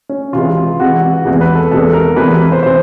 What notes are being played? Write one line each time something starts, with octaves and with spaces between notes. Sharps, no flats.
C#4
C2 C3 E3 G#3 F4
C2 C3 E3 G#3 F#4
E2 C3 E3 G#3
B4
A4
E2 C3 E3 G#3 A4
A#4
E2 C3 E3 G#3 B4
B4
C5
C3 E3 C5